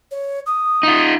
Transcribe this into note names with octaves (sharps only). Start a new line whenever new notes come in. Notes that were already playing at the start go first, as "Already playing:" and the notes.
C#5
D#6
D#4 F4